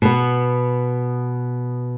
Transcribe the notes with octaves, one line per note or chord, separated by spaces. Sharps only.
B2 B3